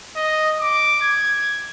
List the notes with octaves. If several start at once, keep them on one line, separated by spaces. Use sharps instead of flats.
D#5
D6
G#6